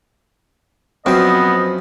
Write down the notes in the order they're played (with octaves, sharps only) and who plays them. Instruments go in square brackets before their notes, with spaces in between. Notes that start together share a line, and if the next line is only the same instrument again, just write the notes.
[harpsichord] F#2 F3 [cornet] B3 [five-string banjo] C4 [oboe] D#5